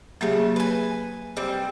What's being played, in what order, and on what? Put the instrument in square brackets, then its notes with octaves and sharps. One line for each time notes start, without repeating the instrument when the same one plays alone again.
[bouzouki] C#3 A3 [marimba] F#3 A#3 G4
[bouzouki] B4 G#5
G3 C4